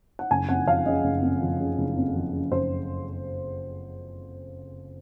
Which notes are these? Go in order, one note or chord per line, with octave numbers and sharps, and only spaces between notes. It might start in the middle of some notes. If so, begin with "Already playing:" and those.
F#5
F#1 G#5
F2 F#5
F3 F5
C#3 D#5
F#1
F2
F3
C#3
F#1
F2
F3
C#3
F#1 C5